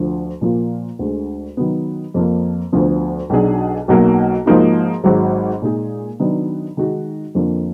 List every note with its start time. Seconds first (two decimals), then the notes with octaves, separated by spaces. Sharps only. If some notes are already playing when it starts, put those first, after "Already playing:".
Already playing: D2 D3 F3
0.41 A#2 F3 A#3 F4
0.99 D2 D3 G#3
1.57 D#3 F#3 B3
2.14 F2 F3 A#3
2.72 D2 D3 F3 B3
3.30 B1 B2 F#3 D4 G#4
3.88 B1 B2 F#3 A#3
4.46 G#2 F3 A#3 D#4 F#4
5.04 G#1 G#2 F#3
5.62 A#2 G#3 D#4 G#4
6.20 D#3 F#3 B3 D4
6.77 D#3 G#3 D#4 F#4
7.35 F2 D3 F3 A#3